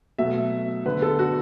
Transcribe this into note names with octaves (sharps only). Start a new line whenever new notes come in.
B2 F#3 A3 E5
D3 B3 B4
A4
F#4